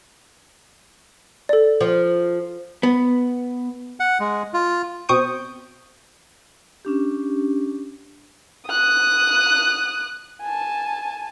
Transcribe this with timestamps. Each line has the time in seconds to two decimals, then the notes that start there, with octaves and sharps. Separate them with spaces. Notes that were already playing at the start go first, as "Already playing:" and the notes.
1.49 A4 D5
1.81 F3
2.83 B3
4.00 F#5
4.20 G#3
4.54 F4
5.09 B2 C4 C#6 D#6 G6 D7
6.85 C#4 D4 G4
8.67 D#6 F#6
10.42 G#5 A5